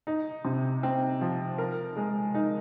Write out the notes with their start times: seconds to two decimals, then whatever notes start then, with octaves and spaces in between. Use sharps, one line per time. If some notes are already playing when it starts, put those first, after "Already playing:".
0.07 D#4
0.45 C3
0.83 C4
1.21 F3
1.58 A#4
1.96 G#3
2.34 D#4